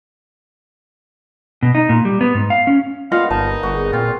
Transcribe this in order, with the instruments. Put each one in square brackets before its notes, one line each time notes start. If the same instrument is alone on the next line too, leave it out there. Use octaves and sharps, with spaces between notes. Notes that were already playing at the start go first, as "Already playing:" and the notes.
[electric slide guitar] B2
D#4
A#2
G3
B3
G#2
F5
C#4
[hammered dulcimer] A#2 B3 [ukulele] F4 D#5 F#5 [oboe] F5
[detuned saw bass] G1 [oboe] D#4 [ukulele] A5
[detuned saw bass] G1 [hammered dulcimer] F#4 G#4
[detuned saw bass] A#2 [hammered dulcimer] C4 [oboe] F4